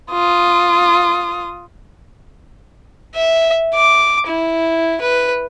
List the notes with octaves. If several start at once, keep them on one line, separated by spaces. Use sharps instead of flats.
F4 D#6
E5
D6
E4
B4